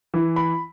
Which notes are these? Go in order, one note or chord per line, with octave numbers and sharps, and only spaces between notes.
E3
B5